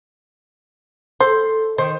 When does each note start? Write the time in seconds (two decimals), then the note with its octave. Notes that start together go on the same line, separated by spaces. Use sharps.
1.20 A4 C5
1.78 D#3 C5